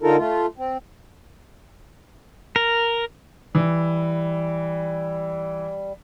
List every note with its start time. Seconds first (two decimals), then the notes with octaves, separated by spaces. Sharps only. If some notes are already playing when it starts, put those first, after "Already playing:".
0.03 D3 D#4 F4 A4 A#4
0.17 A3 F4
0.58 C4
2.56 A#4
3.55 E3 G3